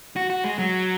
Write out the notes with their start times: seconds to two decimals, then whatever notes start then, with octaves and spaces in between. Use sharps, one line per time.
0.16 F#4
0.30 F#4
0.44 G#3
0.59 F#3